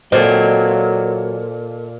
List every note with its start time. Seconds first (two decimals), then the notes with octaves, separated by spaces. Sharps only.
0.12 A#2 F#3 A4 C5 D5 D#5